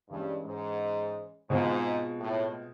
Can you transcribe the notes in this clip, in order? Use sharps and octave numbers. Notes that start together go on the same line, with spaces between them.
G2 E3 G#3 C#4
G#2
G#2 B2 G#3 C4 F4
A2